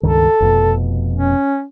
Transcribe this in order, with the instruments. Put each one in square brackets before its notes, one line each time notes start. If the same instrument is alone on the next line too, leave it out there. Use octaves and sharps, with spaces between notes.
[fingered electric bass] C#2 G2 D#3 [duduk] A4
[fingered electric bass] F1 F2 B2
[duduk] C#4